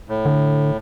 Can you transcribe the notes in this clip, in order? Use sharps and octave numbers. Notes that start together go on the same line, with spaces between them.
A2
D3